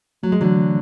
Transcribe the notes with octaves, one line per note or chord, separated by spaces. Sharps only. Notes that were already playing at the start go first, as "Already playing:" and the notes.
F#3 A3
G#3
D3 E3 F#3
E3